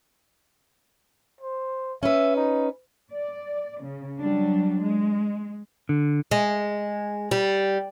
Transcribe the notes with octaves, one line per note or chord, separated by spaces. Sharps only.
C5
C#4 B4 E5
D#4
D5
C#3
F#3 G3 D4
G#3
D3
G#3
G3